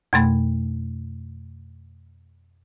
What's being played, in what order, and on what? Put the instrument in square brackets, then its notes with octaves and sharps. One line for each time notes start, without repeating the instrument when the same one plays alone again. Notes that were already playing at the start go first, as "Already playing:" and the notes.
[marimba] F2 B2 A3 B5